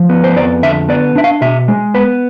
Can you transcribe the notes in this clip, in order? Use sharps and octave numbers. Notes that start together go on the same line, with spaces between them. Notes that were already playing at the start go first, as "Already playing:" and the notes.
Already playing: F3
B3
C5
F2 D5
D3 E5
B3 D5
D4 E5
F5
B2 E5
G#3
B3 B4